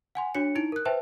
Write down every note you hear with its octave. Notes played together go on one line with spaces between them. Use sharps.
F#5 G#5 C6
D4 F#4 C#5 C#7
D#4 E4 D7
A#4 F#6
B4 C5 E5 G5 A5